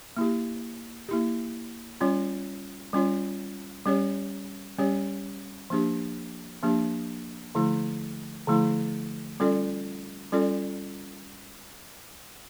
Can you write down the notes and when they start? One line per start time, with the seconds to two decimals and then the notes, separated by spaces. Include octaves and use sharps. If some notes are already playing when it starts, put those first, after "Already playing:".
0.17 A#3 E4 G4
1.09 A#3 E4 G4
2.01 G3 C#4 F4 C#5
2.93 G3 C#4 F4 C#5
3.86 G3 C#4 G4 C#5
4.78 G3 C#4 G4 C#5
5.70 F3 A#3 D4 G4
6.63 F3 A#3 D4 G4
7.55 D3 F3 A3 E4
8.47 D3 F3 A3 E4
9.40 G3 C#4 F4 A4 D5
10.32 G3 C#4 F4 A4 D5